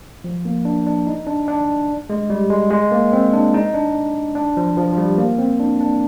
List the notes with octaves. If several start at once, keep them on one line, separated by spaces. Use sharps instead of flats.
F3
A#3
D4
D4
D#4
D4
D4
G#3
G3
G#3
G#3
A#3
C4
D4
D#4
D4
D4
F3
F3
F3
G3
A#3
C4
D4
D4